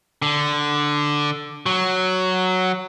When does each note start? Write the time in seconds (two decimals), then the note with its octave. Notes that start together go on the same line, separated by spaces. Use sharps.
0.22 D3
1.66 F#3